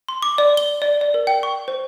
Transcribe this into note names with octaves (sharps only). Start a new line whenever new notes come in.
C6
D6
D5
G7
D5
D5
A#4
G5
C#6
C5